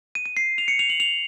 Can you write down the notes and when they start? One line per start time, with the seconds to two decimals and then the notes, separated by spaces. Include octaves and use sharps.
0.15 D#7
0.26 D#7
0.37 C7
0.58 F7
0.68 C#7
0.79 F7
0.90 F#7
1.00 F7